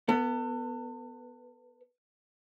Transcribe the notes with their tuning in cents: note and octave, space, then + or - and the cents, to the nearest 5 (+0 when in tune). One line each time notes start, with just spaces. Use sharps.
B3 +0 A4 +35